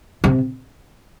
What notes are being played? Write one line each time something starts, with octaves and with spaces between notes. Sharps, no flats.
C3